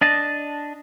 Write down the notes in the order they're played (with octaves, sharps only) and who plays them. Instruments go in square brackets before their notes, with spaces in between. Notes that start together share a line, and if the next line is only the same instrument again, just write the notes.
[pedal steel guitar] D4 D#5 A5